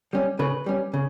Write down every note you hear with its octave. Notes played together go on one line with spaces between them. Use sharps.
G3 C#4
C#3 B4
G3 C#4
C#3